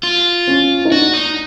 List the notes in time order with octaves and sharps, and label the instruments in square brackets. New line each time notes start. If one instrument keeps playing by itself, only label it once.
[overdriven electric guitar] F4
[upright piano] C#4
D#4
[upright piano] D4 [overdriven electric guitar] F#4
[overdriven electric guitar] D#4